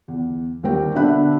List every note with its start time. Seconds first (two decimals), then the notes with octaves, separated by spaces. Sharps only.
0.08 E2
0.63 D#2 G3 C4 G5
0.95 B2 D3 D4 E5 B5 F#6